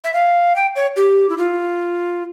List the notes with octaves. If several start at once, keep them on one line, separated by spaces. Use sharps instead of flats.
E5
F5
G5
C#5
G4
E4
F4